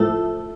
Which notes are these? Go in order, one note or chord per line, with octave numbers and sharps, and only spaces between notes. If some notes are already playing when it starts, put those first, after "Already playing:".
Already playing: A2 F3 A3 A4